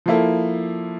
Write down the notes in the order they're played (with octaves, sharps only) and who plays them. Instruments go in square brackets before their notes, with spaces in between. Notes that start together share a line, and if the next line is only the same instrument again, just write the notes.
[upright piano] F3 A#3 E4 A4